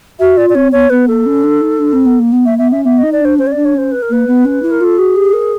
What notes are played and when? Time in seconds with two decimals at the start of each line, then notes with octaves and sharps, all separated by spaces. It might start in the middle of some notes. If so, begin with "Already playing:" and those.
0.19 F#4 E5
0.37 F4 D5
0.50 D5
0.55 C4 C#5
0.72 B3 C#5
0.90 B3 B4
1.08 A#3 A4
1.26 C#4
1.43 D4
1.61 D#4
1.79 D4
1.93 C4
2.05 B3
2.19 A#3
2.32 B3
2.45 A#3 E5
2.59 B3 E5
2.72 C#4 E5
2.85 B3 E5
2.98 D#4 D#5
3.12 D5
3.21 D4 C5
3.38 C#4 C5
3.47 C#5
3.52 D4 D5
3.65 C#5
3.74 C#4 C5
3.92 B4
4.02 A#4
4.10 A#3 B4
4.27 B3
4.45 C#4
4.62 E4
4.71 A#4
4.80 F4 A4
4.98 F#4 G#4
5.16 G4
5.33 A#4